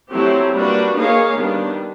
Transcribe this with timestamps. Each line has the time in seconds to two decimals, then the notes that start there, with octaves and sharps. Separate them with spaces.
0.11 F#3 A3 C4 E4 G4
0.54 G3 A#3 D4 F#4 B4
0.95 A#3 D#4 G#4 C#5 F5
1.37 D#3 G3 B3 D4